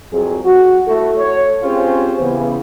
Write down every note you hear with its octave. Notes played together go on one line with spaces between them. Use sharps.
C2 F2 C3 F#3 G#4
F#4
A3 E4 F#4 A4
C#5
C4 C#4 F4 G4 G#4 C5
C#3 E3 B3